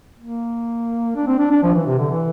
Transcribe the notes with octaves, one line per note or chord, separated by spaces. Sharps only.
A#3
D4
C4
D4
D4
F3
E3
C3
D3
E3